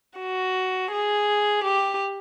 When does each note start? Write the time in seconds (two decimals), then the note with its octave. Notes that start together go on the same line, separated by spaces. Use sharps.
0.19 F#4
0.92 G#4
1.65 G4